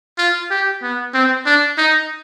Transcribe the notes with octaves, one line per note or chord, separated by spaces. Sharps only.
F4
G4
B3
C4
D4
D#4